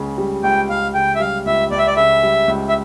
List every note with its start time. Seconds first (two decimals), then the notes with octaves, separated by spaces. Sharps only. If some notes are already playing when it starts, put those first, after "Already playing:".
Already playing: C#2 C#3
0.18 G3
0.43 C#2 G5
0.69 C#2 F5
0.94 C#3 G5
1.15 E5
1.20 G3 F5
1.46 C#2 E5
1.71 C#2 D5
1.79 E5
1.87 D5
1.97 C#3 E5
2.23 G3
2.48 C#2
2.69 E5